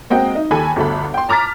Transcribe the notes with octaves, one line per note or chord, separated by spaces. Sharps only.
G#3 A#3 C4 F#4 D#5 G5
D#4
D#2 A4 G#5 B5
G1 D2 A4 B5
G5 C6
A5 A#5 D6 F6 A6 B6